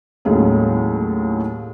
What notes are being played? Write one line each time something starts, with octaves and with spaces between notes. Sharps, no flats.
D#2 A2 F#3 G#3 C#4